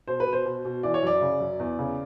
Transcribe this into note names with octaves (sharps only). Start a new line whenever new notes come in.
B2 C5
B4
B2
C5
B2
B2
E3 D5
C#5
F#2 D5
C#3
F#2
E2
C#3